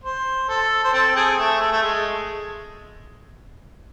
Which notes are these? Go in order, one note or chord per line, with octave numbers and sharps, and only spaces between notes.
C5
A4
C5
C4 A4
C4 G#4
A3
A3
A3
G#3